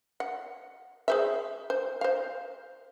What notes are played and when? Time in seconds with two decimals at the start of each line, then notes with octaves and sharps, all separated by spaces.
0.20 F#5
1.08 G#4 C5 E5
1.70 C5
2.01 C5 F5